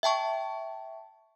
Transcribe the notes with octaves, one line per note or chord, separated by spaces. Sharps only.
E5 G5 A5 C#6